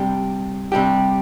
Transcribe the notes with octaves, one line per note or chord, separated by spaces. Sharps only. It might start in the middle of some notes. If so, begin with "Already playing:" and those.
Already playing: C3 G3 D4 G4
C3 G3 D4 G4